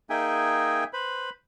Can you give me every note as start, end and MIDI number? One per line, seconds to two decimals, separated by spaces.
0.10 0.84 58
0.10 0.84 63
0.10 0.84 68
0.10 0.84 76
0.10 0.84 79
0.10 0.84 80
0.93 1.30 71
0.93 1.30 72
0.93 1.30 83